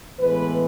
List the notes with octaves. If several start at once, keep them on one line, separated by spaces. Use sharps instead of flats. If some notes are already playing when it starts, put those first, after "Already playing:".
A2 E3 G#3 B3 B4